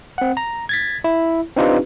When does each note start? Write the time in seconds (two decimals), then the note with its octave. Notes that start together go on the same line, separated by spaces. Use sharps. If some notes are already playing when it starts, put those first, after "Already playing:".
0.18 C4 F#5
0.37 A#5
0.69 G#6 A6 B6
1.04 E4
1.57 C4 D4 D#4 F4 G4 B4